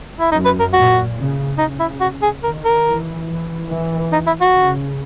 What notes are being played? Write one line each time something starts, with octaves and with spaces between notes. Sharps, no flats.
E4
F#2 D#4
B4
A#4
A#2 F#4
C#3
C#3 D#4
E4
F#4
G#4
D#3 A#4
A#4
E3
E3
E3
D#4
E4
F#4
C#3